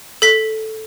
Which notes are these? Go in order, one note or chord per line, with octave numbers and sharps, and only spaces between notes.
A4 B6